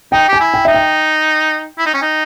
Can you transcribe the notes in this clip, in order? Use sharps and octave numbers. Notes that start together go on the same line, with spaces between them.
D#4 G5
G4 G#5
E4
G5
D#4 E5
G5
E4
D#4
C#4
D#4